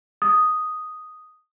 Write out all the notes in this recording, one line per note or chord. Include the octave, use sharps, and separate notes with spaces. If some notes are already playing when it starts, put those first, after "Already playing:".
D#6